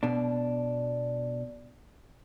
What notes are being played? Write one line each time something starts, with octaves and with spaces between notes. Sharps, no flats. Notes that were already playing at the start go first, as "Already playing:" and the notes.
B2 D4